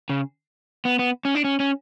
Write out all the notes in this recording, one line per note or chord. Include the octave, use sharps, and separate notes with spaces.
C#3
B3
B3
C#4
D4
C#4
C#4